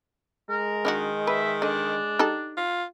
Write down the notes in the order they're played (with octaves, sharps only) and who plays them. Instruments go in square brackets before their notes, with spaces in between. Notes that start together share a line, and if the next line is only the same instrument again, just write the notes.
[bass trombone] G#3 [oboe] A#4
[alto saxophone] D#3 [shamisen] D4 E4 F#4
[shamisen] B4 [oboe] E5
[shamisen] D3 D#5 [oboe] D4
[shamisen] D#4 G4 A4
[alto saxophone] F4